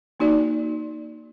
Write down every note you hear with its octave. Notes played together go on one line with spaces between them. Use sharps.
A#3 D#4 F#4 D5